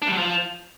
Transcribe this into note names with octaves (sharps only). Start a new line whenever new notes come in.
D4
G3
F#3
F3